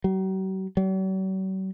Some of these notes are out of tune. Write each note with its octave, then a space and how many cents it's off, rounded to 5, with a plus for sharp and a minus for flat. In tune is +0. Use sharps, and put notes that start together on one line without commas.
F#3 +45
F#3 +45